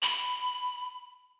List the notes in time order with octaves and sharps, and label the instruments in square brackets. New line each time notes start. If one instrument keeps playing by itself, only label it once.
[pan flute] B5